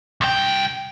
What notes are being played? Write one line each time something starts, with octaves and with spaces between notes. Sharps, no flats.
C2 G5